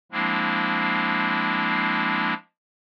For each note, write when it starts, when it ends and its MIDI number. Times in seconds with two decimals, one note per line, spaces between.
0.12 2.34 53
0.12 2.34 56
0.12 2.34 58
0.12 2.34 60
0.12 2.34 62
0.12 2.34 64